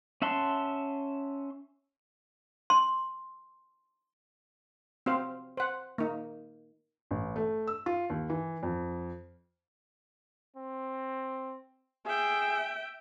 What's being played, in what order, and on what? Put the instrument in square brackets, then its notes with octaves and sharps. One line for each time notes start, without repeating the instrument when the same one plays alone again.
[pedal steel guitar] C#4 E5 F#5 A5 C6
[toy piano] C6
[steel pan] C4 F#4 C5 F5
C5 F#5
A#3 D#4
[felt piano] A1
A3
E6
F4
D#2
E3
F2
[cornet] C4
[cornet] G#4 [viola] E5 G5